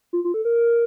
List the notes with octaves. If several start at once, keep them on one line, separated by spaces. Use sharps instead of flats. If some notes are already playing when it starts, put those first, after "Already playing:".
F4
F4
A4
A#4